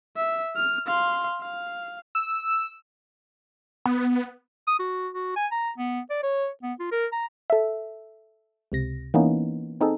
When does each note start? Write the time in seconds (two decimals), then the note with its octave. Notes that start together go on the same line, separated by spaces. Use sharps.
0.16 E5
0.56 F6
0.87 F5 C6
1.42 F5
2.15 E6
3.86 B3
4.67 D#6
4.79 F#4
5.14 F#4
5.36 G#5
5.52 A#5
5.78 B3
6.10 D5
6.23 C#5
6.63 B3
6.79 F4
6.91 A#4
7.12 A#5
7.50 A4 E5
8.72 C#2 C3 A#6
9.14 E3 A#3 B3 C#4 D#4
9.81 C4 D#4 G#4 A4